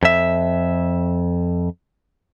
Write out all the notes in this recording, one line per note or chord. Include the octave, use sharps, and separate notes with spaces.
F2 E5